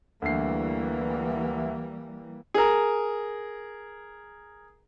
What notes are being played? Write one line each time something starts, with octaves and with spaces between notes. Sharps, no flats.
D2 E3 G3 A#3 C7
G#4 A#4